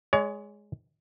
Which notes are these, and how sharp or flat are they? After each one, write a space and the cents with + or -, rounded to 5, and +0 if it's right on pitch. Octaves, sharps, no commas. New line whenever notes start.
G#3 +0 C#5 +35